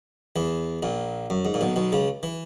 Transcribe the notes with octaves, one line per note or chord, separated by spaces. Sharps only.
E2 E3
A#1 A#2
F#2
G#2
A#2
B1 B2
B1 B2
C#2 C#3
E3